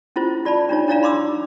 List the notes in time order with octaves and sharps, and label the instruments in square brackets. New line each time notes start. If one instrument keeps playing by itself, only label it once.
[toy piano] C#4 E4 F4 C5
F4 D5 A5 B5
D4 D#4 F4 C#5
D4 E4 C#5 D5 F5 A#5
B5 C6 D6 E6